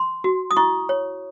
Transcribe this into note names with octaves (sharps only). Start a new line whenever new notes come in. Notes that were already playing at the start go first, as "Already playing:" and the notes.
Already playing: C6
F#4
D#6
E4 C#6
C#5